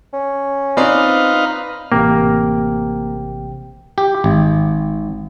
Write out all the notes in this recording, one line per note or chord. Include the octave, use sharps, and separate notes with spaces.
C#4
C4 D#4 F4 B4 D5 F5
A1 C3 A#3 G5
G4
G#1